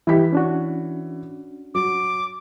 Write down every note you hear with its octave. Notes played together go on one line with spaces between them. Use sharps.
E3 E4 G4 B6
C#4 D4 F#4
F#3 D6